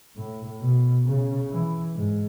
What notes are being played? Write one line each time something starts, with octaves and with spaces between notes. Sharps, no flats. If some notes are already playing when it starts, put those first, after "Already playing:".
A2
B2
C#3
E3
G#2